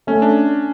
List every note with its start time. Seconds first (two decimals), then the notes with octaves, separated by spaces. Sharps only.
0.07 A3 C#4
0.22 D4